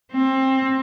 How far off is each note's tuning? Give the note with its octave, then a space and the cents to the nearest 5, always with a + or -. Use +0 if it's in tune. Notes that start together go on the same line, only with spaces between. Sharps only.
C4 +20